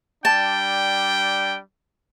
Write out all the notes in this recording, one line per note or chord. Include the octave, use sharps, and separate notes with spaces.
G3 D4 G5 A5